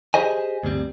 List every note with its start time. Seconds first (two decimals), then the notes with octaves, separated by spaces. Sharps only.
0.14 G4 G#4 C5 D#5 G#5
0.63 D2 G2 G3 C4